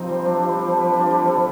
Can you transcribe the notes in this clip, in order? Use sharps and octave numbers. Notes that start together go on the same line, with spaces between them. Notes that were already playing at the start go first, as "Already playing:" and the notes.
Already playing: C3 F3 C4 D#4
G3
D4
G3
A4
G3
D4
G3
A4